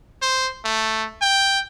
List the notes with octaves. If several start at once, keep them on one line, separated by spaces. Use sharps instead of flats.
C5
A3
G5